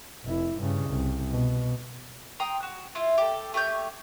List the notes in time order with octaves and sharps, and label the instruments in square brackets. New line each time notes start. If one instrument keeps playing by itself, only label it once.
[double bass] F1 E4
G2 C#3
C2
B2
[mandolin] G5 A#5 C6 D#6
F#4
E4 F4
G4 A4
A3 G4 C#5 G6